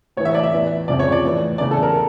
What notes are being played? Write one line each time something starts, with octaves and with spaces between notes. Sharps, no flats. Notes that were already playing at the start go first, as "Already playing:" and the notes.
A2 E3 C#5
E5
D5
E5
E2 E3
F2 C#3 F3 D5
C#5
D5
A2 E3
E2 C#3 E3 D5
A4
A#4